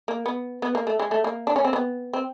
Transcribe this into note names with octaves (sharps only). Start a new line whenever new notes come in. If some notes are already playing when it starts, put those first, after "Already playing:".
A#3
B3
B3
A#3
A3
G#3
A3
A#3
D4
C#4
C4
B3
C4